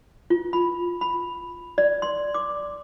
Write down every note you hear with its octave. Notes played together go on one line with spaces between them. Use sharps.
F4
B5
B5
D5
C6
D6